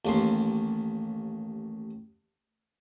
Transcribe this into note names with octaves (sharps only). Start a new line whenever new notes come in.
A1 D#2 C6